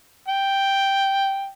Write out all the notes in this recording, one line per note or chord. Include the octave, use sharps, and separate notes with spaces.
G5